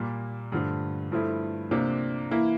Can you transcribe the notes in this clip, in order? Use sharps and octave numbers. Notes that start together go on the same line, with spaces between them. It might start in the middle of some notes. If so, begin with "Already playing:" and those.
Already playing: A#2 G3 A#3
G2 D3 F3 A3
G2 F3 A3 E4
C3 F3 A#3 D4
E3 A#3 E4